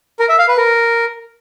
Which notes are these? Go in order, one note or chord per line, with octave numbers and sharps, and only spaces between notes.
A#4
E5
F5
B4
A#4